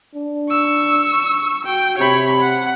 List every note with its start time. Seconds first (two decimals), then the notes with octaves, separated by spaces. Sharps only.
0.15 D4
0.50 C#6 E6
1.64 F#4 G5
1.98 C3 C#5 B5
2.42 F#5